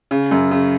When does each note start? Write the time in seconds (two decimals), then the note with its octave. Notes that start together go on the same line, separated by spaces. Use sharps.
0.11 C#3
0.31 F#2
0.51 C#3